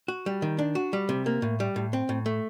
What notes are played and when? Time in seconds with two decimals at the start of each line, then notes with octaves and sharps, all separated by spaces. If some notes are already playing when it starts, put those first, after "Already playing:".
0.08 F#4
0.26 G3
0.42 D#3
0.59 D4
0.75 F#4
0.93 G3
1.09 C3
1.26 A#3
1.42 A2
1.60 G3
1.76 A2
1.93 C4
2.09 A2
2.26 A3